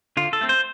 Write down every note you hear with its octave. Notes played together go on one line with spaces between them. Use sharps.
D3 F4
A4
A3 C4
C5